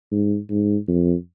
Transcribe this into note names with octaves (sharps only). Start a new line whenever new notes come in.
G#2
G#2
F2